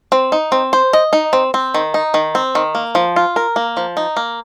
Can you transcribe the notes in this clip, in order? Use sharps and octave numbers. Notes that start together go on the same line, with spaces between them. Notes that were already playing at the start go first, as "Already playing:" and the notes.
C4
D#4
C4
C5
D#5
D#4
C4
C4
D#3
D#4
D#3
C4
D#3
A#3
F3
F4
A#4
A#3
F3
D#4
A#3